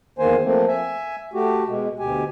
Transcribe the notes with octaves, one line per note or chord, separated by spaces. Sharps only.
E2 D#3 A#3 C5 G#5
F3 A3 A#3 C4
E5 G#5
A3 F#4 G4
B2 G#3
D2 B2 G4 G#5